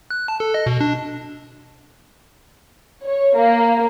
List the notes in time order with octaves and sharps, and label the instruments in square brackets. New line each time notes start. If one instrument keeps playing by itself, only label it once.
[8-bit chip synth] F#6
A5
A4
D#5
B2
D4
[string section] C#5
A#3